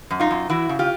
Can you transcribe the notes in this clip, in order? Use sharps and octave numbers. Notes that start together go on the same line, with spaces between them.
F#2
D#4 F4
F#2
E3 E4 F#4
C#3
F4 G4